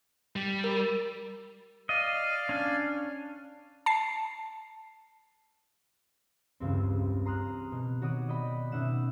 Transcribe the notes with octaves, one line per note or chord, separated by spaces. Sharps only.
G3
A#4
D5 D#5 F5
C#4 D4
A5 C7
E1 C#2 G2 C4
A#5 C6 D#6 F6 F#6
B2
D#3 F#4 C#5 D6 D#6 D#7
D5 D#5 G5 B5
B2 C#4 D#4 E5 F#5 E7